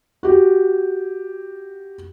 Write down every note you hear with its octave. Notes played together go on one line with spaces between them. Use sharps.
F#4 G4